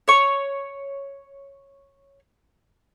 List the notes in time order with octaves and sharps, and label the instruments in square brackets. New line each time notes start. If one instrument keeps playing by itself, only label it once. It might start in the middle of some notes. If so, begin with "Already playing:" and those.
[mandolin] C#5 C#6